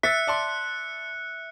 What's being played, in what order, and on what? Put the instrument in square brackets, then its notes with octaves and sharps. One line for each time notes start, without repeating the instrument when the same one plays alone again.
[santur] E5 [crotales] F#6 C#7 [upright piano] A6 B6
[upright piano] D5 A5 C6